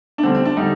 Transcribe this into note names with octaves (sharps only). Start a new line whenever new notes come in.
D4
D3 G3 C4
C4
D4
D3 G3 D#4